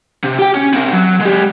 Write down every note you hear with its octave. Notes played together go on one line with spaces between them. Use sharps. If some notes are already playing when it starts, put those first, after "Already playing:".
C3
G4 G5
C#4
C4 A#4
F#3
G#3 G4